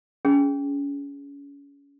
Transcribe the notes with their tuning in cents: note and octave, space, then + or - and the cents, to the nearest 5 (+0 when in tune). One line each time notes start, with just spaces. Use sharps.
C#4 +25 G#4 +0